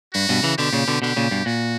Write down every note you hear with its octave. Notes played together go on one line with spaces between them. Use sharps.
G2 F#4
G2 B2
C#3 E3
B2 D3 G4
A#2 C#3
B2 D3
B2 D3 G4
A#2 C#3
G2 B2
A#2 F#4